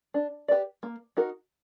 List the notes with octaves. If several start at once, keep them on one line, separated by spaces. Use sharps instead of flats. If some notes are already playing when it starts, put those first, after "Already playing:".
D4
G4 B4 D5
A#3
D#4 F#4 A#4